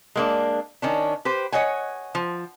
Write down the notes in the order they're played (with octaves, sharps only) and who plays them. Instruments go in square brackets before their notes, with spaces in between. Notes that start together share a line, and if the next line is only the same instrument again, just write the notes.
[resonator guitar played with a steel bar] G#3 A#3 D4
D#3 C#4 D4
G4 B4 C5
C#5 D#5 F#5 G#5
F3